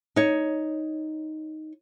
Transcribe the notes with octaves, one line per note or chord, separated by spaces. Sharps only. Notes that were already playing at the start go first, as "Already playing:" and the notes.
D#4 C#5